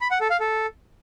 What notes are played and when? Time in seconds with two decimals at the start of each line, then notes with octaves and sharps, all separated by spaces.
0.01 B5
0.11 F#5
0.21 A4
0.30 F5
0.40 A4